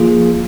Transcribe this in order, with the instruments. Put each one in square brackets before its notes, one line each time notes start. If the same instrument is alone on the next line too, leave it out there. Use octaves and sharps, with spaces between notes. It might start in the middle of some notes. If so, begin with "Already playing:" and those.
Already playing: [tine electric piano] F3 A#3 F4 G#4